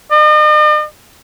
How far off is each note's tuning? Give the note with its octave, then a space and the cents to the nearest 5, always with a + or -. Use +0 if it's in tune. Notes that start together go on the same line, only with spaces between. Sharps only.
D#5 -45